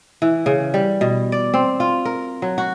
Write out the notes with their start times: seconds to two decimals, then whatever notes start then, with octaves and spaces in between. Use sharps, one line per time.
0.22 E3
0.46 C#3
0.74 G3
1.01 B2
1.32 D5
1.54 C4
1.80 F4
2.05 A#4
2.42 F#3
2.58 F#4